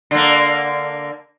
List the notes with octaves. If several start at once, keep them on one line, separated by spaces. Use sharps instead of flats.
D3 A#3